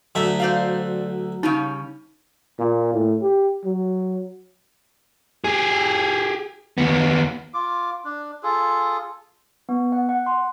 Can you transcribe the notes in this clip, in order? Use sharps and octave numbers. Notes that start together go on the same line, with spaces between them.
D2 F#3 A3 E5
C5 D5 F5
C#3 G3 C#4 D#4
A#2
A2
G4
F#3
G4 G#4
D#2 B3
F4 D6
D4
F4 G#4 A4
B3
F#5
F#5
C6